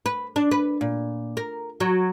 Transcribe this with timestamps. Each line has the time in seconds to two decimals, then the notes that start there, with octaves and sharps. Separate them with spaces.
0.06 B4
0.36 D4
0.51 B4
0.81 A#2
1.37 A#4
1.80 F#3